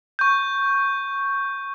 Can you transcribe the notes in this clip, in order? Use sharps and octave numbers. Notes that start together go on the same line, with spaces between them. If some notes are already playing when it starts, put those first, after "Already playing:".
C#6 G6